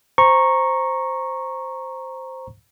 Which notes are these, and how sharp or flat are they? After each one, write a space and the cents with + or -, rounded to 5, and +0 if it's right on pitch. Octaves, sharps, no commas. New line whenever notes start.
C5 +0 A#5 +0 C#6 -10